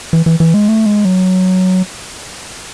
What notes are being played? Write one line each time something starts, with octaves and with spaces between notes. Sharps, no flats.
E3
E3
E3
G#3
A3
G#3
F#3